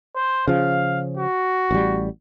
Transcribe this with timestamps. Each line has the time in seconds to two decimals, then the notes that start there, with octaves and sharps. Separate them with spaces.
0.16 C5
0.48 C#3 F3 F5
1.17 F#4
1.71 A1 G3